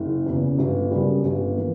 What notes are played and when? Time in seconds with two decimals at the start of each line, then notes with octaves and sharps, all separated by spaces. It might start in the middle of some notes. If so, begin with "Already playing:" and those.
Already playing: F#1
0.26 E2 C#3
0.58 G1
0.91 F#2 C#3 G3
1.24 G1
1.56 E3 A#3